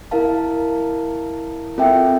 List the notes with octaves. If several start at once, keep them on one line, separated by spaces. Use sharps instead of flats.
E4 A#4 F5 A5
C4 F4 A4 E5 G5